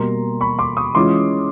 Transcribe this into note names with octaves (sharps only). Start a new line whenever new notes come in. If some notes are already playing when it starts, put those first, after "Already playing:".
Already playing: B2 G3 A#3 A#5 C6
B5 C#6
C6 D6
C#6 D#6
E3 G#3 C#4 F4 C6 D6